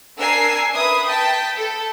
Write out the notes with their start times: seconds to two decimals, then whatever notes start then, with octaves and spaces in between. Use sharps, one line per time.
0.19 D4 A#4 G#5 E6 C7
0.75 B4 E5 D#6
1.08 G5 A5 B6
1.56 A4